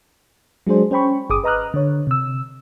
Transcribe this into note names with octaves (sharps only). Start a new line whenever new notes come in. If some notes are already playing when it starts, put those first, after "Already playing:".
F#3 G#3 D4 G#4 C5
C#4 C5 G5 B5 C#6
G1 G#4 D6 D#6
B4 D#5 A#5 D#6 F6 F#6
D3 C#5
C3 E6